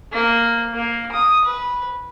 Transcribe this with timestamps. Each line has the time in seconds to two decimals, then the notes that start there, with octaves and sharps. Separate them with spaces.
0.13 A#3
0.74 A#3
1.12 D#6
1.45 B4